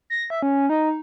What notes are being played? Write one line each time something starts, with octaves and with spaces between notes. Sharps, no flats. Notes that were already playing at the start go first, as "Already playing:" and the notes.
A#6
E5
C#4
D#4